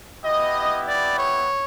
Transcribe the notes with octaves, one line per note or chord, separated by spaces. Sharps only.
B3 E4 G4 D#5
D5
C#5